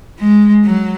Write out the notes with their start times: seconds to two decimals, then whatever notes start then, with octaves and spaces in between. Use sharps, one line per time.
0.19 G#3
0.64 F#3